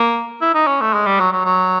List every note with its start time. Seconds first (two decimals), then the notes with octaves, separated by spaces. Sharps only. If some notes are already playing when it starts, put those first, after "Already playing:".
Already playing: A#3
0.41 E4
0.54 D#4
0.67 C#4
0.81 A3
0.94 G#3
1.06 G3
1.20 F#3
1.32 F#3
1.45 F#3